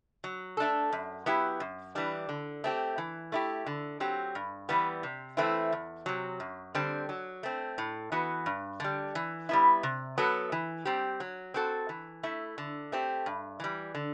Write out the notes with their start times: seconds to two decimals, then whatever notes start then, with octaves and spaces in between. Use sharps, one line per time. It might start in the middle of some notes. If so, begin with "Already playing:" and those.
0.24 F#3
0.57 A3 D4 A4
0.92 F#2
1.26 F#3 B3 E4 G4
1.60 F#2
1.95 E3 G3 D4
2.29 D3
2.64 A3 C4 G4
2.98 E3
3.32 A3 E4 G4
3.66 D3
4.00 F#3 C4 G4
4.35 G2
4.69 E3 G3 B3
5.03 C3
5.37 E3 A3 C4 E4
5.72 E2
6.06 C3 F#3
6.40 F#2
6.75 D3 G3 C4
7.09 F#3
7.43 A3 C4
7.78 A2
8.12 E3 B3 F#4
8.46 G2
8.80 D3 G3
9.15 E3
9.49 G3 B3 E4
9.83 C3
10.18 F#3 B3 F#4 A4
10.52 E3
10.85 G3 C4 G4
11.20 F#3
11.54 C4 F#4 A4
11.89 E3
12.23 A3 E4
12.58 D3
12.92 A3 C4 G4
13.26 G2
13.60 E3 G3
13.95 D3